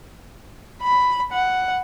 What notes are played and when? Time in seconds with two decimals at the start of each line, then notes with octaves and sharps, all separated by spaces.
0.82 B5
1.32 F#5